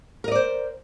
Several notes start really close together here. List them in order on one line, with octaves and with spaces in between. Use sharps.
A#4 D#5 D5 C5